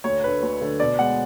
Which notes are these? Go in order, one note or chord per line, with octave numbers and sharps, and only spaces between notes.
D2 C#5
D3 A3 B4
D2
D3 A3
B2 D5
G#3 B3 F#5